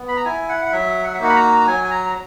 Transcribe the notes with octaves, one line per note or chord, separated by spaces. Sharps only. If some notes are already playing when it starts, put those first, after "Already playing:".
Already playing: B3
B5
A#5
E4 G#5
F#5
F#5
F#3 E5
F#5
E5
A#3 D#4 F#4 F#5
B5
A#5
A#5
F#3 G#5
G#5
A#5
A#5